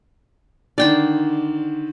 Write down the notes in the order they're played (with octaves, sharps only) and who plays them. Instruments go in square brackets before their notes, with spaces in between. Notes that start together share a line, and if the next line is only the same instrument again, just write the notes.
[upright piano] D3 D#3 [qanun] D5 G5 C6